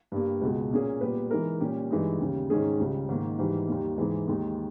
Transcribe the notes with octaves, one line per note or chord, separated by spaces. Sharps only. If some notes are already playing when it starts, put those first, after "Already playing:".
G2 G3 A#3
C#2 B2 G#3
A#2 A#3 C#4 G#4
A#2 G3 B3 G4 B4
E3 G#3 D#4 A#4
A#2 G3 C#4 G4
G2 E3 G#3 D#4
D#2 C#3 G3
G#2 D#3 G#3 C#4 G#4
C#2 C#3 G3
G#2 D#3 A#3
G#2 E3 G3
D#2 D#3 G3 A#3
G#2 E3 G#3
D#2 D#3 G#3